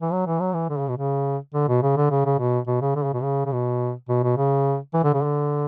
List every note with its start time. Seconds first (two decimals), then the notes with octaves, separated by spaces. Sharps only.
0.02 E3
0.12 F#3
0.27 E3
0.40 F#3
0.53 E3
0.69 D3
0.79 C#3
0.88 B2
0.97 C#3
1.54 D3
1.69 B2
1.82 C#3
1.97 D3
2.11 C#3
2.25 C#3
2.39 B2
2.67 B2
2.82 C#3
2.96 D3
3.04 C#3
3.14 B2
3.23 C#3
3.46 C#3
3.52 B2
4.09 B2
4.23 B2
4.37 C#3
4.94 E3
5.04 D3
5.14 C#3
5.23 D3